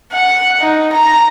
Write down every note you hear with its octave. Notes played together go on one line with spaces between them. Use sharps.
F#5
D#4
A#5